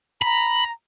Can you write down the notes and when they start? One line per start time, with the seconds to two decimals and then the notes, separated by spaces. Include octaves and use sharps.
0.22 A#5 B5